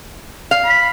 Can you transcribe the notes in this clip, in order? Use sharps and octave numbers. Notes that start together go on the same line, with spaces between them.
F5
B5